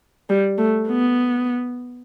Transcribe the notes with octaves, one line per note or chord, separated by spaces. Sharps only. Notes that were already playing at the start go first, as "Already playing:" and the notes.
G3
A3
B3